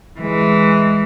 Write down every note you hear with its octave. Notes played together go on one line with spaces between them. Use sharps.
E3 G#3